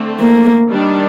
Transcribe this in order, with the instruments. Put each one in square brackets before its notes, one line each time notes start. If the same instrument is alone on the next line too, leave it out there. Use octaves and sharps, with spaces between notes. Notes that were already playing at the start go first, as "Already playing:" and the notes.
Already playing: [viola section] D3 A3 C4
[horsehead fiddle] A#3
[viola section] D#3 G3 D4